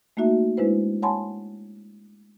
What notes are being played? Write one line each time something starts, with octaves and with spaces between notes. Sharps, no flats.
A3 A#3 D#4 F#4 E5
G#3 D4 E4 B4 C5
C#5 F#5 G#5 A5 B5 C6